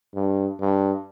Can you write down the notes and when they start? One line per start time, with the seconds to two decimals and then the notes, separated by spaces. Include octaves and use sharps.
0.14 G2
0.60 G2